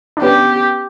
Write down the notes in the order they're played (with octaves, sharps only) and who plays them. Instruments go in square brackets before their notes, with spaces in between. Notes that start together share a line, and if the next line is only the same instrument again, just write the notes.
[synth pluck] D4
[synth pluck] B3 C#4 [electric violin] G4